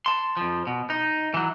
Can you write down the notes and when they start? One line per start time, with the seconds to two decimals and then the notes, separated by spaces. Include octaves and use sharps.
0.06 A5 C6
0.37 F2 F3
0.67 B2
0.90 D#4
1.34 E3 F#3